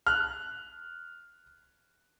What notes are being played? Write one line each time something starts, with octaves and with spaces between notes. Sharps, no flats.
F6 F#6